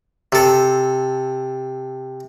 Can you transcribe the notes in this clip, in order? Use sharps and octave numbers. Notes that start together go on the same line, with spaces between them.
C3 A4